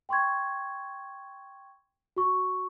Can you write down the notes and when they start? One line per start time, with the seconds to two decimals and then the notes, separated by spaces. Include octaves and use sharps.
0.09 G5 C6 C#6 G#6
2.16 F#4 C#6